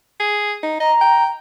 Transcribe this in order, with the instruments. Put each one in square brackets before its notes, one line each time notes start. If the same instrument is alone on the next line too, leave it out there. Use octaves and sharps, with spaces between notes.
[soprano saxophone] G#4
D#4
[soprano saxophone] D#5 [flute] A#5
[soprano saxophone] G5